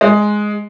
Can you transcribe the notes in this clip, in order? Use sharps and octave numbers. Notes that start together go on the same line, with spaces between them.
G#3